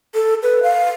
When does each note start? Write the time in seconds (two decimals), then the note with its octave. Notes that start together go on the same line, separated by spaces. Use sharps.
0.14 A4
0.43 B4
0.63 F5